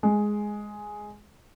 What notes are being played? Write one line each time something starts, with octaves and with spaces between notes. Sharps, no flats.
G#3